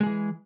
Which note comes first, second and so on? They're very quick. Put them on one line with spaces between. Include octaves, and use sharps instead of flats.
G#3 G#4 E3